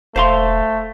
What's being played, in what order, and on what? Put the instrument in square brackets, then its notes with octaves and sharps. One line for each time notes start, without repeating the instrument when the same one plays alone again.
[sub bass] E1 [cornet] A3 [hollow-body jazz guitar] C5 F5 C6